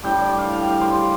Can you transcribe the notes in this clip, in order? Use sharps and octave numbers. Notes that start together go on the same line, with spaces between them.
A2 G3 D4 G5
D5
F5
G5
F5
C5
G4